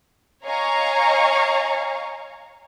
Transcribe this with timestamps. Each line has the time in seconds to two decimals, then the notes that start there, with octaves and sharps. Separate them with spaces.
0.44 C#5 D#5 F5 G#5 A#5 C#6